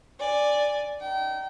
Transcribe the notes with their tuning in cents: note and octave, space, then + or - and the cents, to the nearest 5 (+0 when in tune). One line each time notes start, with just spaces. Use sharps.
D5 +0 G#5 -10
D#4 -10 G5 -30